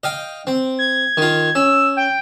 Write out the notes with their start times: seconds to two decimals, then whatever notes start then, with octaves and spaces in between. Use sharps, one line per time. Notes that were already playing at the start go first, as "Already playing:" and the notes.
0.04 D#5 F5 G5
0.47 C4
0.79 G#6
1.17 D#3 F4
1.55 C#4 E6
1.97 G5